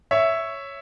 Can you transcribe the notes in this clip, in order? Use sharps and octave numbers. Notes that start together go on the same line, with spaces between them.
C#5 E5